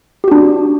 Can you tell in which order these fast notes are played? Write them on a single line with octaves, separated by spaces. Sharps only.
G4 F#4 D4